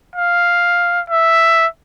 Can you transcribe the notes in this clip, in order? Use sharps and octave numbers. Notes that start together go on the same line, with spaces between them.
F5
E5